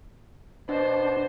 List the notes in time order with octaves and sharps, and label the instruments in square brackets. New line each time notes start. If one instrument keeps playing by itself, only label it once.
[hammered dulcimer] B2 [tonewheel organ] D4 [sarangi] C5